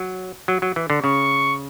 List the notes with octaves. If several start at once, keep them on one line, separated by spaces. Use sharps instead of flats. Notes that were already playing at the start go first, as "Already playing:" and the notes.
Already playing: F#3
F#3
F#3
E3
D3
C#3 C#6